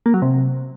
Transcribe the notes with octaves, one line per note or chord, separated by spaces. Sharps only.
A#3
F#3
C3